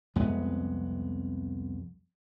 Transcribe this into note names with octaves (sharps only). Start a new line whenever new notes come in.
C2 F2 G#3 B3